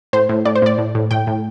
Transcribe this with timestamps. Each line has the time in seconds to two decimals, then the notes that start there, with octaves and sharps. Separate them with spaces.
0.13 A2 C5
0.29 A2
0.45 A2 D5
0.56 C5
0.62 A2 D5
0.78 A2
0.95 A2
1.11 A2 G5
1.27 A2